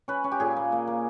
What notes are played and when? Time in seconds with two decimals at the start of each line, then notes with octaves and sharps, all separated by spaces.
0.08 C#4 B4
0.24 C#4
0.32 G4
0.40 A#2 G#4
0.57 A#3
0.72 A#3
0.87 A#3